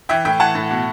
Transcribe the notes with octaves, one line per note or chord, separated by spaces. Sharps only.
E3 E5 G5
A2 E5 G5
E3 F#5 A5
A2
B2